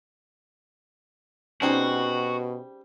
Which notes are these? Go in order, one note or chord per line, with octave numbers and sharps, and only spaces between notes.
B2 G3 C4 C#4 D#4 F#4 G#4